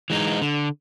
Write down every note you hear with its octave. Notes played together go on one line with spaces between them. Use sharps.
E3 G#3 D#4
D3